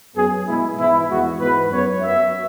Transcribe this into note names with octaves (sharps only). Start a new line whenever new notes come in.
F#2 F#3 B3 G#4
B2 G#3 B3 E4
G#2 E3 B3 E4
E2 E3 G#3 B3 F#4
G#2 E3 B3 B4
F#2 F#3 B3 C#5
F#2 F#3 B3 E5